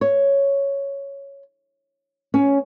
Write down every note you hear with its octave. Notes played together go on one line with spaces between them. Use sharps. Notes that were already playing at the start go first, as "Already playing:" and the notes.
C#5
C#4